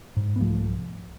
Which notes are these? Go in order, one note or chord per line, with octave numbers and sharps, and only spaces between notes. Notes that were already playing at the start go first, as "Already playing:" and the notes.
G#2
B3
C2 F3 A3